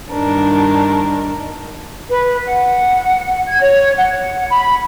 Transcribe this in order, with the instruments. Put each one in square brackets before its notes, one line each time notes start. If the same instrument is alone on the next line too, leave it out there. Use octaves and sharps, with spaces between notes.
[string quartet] G2 D#3 D4 A#4
[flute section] B4
F#5
G#6
C#5
F#5
B5